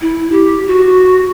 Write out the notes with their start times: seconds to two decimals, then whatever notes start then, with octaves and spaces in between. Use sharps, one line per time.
0.01 E4
0.32 G4
0.67 F#4